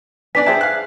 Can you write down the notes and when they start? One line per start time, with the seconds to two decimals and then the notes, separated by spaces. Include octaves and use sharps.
0.35 B3 D4 D5 G#5 B6
0.46 G#4 B4 C5 E5 G5 A5
0.61 F5 F#6